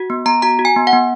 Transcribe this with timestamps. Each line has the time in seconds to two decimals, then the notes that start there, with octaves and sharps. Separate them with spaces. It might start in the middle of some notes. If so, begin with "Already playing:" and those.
Already playing: F#4
0.10 B3
0.26 B3 A#5
0.42 F#4 A#5
0.59 F#4
0.65 G#5
0.76 B3
0.87 F#5
0.93 B3